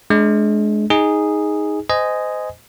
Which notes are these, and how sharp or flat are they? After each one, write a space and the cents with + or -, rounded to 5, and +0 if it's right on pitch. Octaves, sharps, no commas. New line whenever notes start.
G#3 +30 D4 +0
D#4 +10 G#4 -5
C5 -30 D#5 +0 G#5 +0